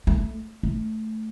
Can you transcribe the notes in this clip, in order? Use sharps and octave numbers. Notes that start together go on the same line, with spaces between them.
A3
A3